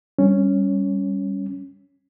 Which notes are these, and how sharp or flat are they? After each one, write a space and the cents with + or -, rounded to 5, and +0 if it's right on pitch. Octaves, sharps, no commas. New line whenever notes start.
G3 +0 C#4 +0